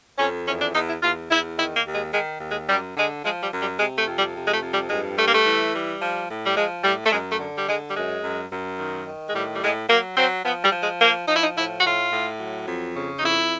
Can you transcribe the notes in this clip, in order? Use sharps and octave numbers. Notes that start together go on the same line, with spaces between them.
F2 C#4
E2 C#4
D4
E2 D#4
E4
E2 F4
E2 E4
D#3 E4
A#3
D#2
G#3
D#3 G#3
D#2
G#3
F#2 G3
D3 G#3
F3 G#3
G3
F#2
G3
C3 G#3
A3
F2
G3
C3
G#3
A3
F2
G3
G2 G#3
G3 A3
A#3
A3
E3
G3
F3
A2
G3
F3 G#3
A2 G3
A3
F#2 G#3
A3
D3
G3
D3 G#3
G3
F#2 G#3
F#2
F#2
D#3
D#3
G#3
A2 G3
G3
A2 G#3
F#3 A#3
F#3 C4
F3 B3
G3
F3
G#3
F3 A#3
F3 D#4
E4
D#4
A2 E4
F#4
A2 F4
A2
F#3
F2
C#3
D#4
F2 E4